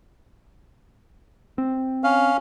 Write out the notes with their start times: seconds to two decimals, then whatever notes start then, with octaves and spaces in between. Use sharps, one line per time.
1.58 C4
2.04 C#4 F5